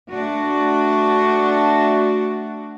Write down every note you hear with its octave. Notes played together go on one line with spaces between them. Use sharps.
A3 D4 F#4